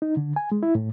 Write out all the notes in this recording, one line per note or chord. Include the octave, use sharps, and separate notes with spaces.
D#4
D3
G#5
G#3
E4
A2